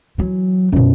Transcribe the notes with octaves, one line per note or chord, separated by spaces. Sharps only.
E3 F#3
F#2 B2